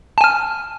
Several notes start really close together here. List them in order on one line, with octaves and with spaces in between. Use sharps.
A5 G#5 F6